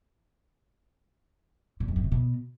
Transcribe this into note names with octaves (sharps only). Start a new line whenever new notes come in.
A#2
F#2
G2
C3
B2